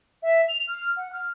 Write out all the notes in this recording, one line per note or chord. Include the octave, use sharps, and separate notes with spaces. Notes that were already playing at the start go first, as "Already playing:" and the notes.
E5
F7
F6
F#5
F6